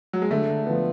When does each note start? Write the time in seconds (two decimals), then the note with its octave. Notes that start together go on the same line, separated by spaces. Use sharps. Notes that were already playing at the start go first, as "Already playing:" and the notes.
0.13 F#3
0.22 G#3
0.31 D3 A3
0.66 F3 B3